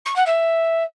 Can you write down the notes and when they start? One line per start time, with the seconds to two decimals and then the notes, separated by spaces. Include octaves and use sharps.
0.05 C#6
0.15 F#5
0.26 E5